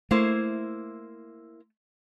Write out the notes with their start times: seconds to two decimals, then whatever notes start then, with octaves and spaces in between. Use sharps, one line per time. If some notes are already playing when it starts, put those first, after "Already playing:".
0.11 A3 A#3 E4 C5